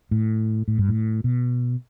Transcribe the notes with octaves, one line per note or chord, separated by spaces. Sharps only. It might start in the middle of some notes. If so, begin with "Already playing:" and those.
A2
A2
G2
A2
B2